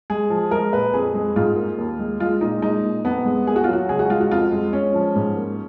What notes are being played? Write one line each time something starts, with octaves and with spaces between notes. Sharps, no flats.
G#3 G#4
F3
G#3 A#4
A#2 B4
F2 G#4
G#3
G#2 F4
A#3
D#2
G#3
G#3 F4
A#2 D#4
G#3 D#4
A#2
F2 B3
G#3
A#3 G#4
F#4
F#3 F4
F#4
C#2 G#4
F#4
G#3 F4
F#4
F2 F4
G#3
G#3 C#4
F3
G#2
A#3